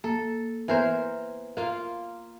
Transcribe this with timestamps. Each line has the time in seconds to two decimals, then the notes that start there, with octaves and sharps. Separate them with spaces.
0.04 A#3 A4
0.68 E3 B3 A#4 C5
1.57 A#3 F4